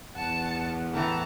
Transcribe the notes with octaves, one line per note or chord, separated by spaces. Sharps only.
E2 F#5 A5 C#7
A2 E3 A5 A#5